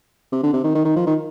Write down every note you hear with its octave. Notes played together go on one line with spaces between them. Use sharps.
C3
D3
C3
D#3
D#3
D#3
F3
D#3